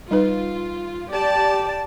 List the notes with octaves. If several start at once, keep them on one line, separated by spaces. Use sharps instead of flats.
G3 D#4 F4 B4
G4 D5 A5